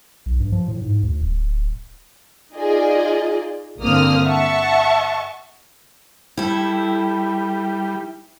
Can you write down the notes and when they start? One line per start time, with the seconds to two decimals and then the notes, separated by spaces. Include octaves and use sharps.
0.26 B1
0.40 G2
0.52 F3
0.68 A2
0.82 G#2
1.03 D2
1.21 D1
2.55 D#4 F4 G#4 D5 D#5
3.80 G1 D3 A#3 C4 D#6 F6
4.26 E5 F#5 A5 C#6
6.37 G3 E4 A4